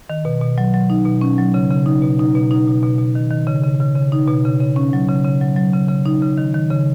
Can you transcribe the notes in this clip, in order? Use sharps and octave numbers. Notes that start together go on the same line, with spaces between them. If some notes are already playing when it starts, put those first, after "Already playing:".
D#3
B2
B2
F#3
F#3
D#4
B2
C#4
F#3
C#3
C#3
D#4
B2
D#4
B2
D#4
B2
B2
B2
D#3
D#3
C#3
C#3
C#3
C#3
D#4
B2
C#3
C#3
C#4
F#3
C#3
C#3
F#3
F#3
C#3
C#3
D#4
C#3
D#3
D#3
C#3